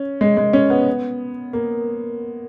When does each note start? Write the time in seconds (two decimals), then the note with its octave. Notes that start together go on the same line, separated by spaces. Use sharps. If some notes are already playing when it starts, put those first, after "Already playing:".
Already playing: C#4
0.21 G#3
0.37 G#3
0.53 C#4
0.70 B3
1.53 A#3